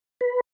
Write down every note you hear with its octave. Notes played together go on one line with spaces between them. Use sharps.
B4